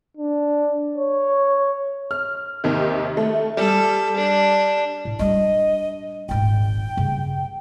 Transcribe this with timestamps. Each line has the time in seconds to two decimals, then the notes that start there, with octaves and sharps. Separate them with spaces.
0.17 D4
0.97 C#5
2.11 F6
2.64 D#2 C3 D#3
3.17 A3
3.57 G3 A4
4.16 D4
5.05 A2
5.19 G3 D4 D#5
6.29 D#1 G#1 G5
6.97 G2 C#3